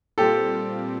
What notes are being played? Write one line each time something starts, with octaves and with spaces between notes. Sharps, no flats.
A#2 G3 C4 F4 G4 A4